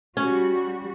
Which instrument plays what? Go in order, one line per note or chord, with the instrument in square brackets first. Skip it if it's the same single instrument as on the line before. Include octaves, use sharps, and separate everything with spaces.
[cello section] G3 F#4 [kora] C#4